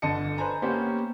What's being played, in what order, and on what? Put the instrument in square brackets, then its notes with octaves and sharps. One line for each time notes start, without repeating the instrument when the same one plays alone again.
[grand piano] G1 D3 D#5 A5 C#7
B4 C5 G#5 A#5
A#3 B3 C#4 G4 C5 C#5